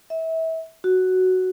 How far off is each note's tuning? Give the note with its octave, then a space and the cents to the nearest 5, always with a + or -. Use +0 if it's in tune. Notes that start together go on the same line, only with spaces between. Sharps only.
E5 -30
F#4 +5